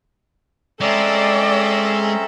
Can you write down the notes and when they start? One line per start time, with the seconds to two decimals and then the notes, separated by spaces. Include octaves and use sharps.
0.81 G#3 C4 C#4 A4 D5 E5 A#5